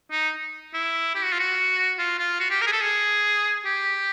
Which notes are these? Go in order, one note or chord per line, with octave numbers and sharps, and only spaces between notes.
D#4
E4
G4
F#4
F4
F#4
F4
F4
F#4
G4
A#4
G#4
A4
G#4
G4